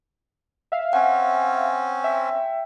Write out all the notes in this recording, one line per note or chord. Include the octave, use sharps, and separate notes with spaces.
E5 F5
C4 C#4 F#5 G#5
E5 G5